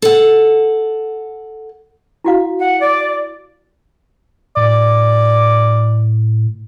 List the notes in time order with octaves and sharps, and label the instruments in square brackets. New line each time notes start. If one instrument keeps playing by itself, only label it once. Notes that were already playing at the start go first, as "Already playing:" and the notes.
[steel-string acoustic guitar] A4 F#5
[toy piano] E4 F#4 F5
[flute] F#5
D5
[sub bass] A2 [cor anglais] D5